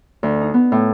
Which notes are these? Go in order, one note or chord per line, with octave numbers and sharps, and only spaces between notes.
D2
D#4
B3
A2